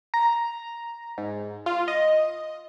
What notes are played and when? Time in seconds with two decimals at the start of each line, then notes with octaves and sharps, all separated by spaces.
0.14 A#5
1.18 G#2
1.66 F4
1.88 D#5